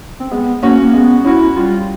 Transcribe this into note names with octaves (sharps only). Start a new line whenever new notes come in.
C4
G#3 B3
A#3 C#4 F#4
A#3
G#3 B3
C#4 E4 F#4
G3 F4